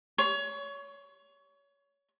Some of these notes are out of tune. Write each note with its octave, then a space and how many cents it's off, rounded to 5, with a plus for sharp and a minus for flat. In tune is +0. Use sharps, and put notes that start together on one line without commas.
C#5 +25